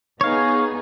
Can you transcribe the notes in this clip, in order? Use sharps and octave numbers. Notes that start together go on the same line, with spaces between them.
B3 D#4 G#4 C#5 F5